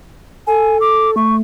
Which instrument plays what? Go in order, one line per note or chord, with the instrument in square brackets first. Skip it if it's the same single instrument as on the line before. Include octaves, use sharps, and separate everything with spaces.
[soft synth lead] A4 [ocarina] G#5
[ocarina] D6
[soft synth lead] A3 [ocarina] C#6